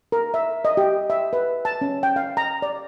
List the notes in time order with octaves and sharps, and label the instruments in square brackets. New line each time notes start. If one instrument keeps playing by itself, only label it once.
[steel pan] A#4
E5
D#5
G4
E5
B4
A5
C#4
G5
F5
A#5
D5